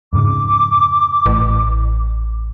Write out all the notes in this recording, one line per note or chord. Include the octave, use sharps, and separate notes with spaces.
F2 G#2 C#3 D6
A1